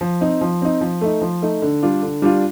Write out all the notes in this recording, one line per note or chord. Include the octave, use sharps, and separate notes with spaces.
F3
C4 D#4
F3
C4 D#4
F3
A3 D#4
F3
A3 D#4
D3
G3 D4 F4
D3
G3 D4 F4